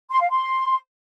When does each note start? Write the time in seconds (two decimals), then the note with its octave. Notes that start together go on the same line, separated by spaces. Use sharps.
0.11 C6
0.21 F5
0.30 C6